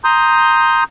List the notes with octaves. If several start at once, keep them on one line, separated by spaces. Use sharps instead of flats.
A#5 C6 D#6 G6